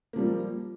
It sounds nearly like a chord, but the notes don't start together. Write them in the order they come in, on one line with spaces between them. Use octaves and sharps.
A#3 F3 G3